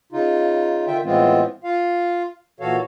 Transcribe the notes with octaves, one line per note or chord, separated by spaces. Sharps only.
C#3 D#4 F4
D3 D#3 F4 E5 G5
A2 E3 G#3 B3 C4 F4
F4 F5
A#2 E3 F#4 A4 C#5 F5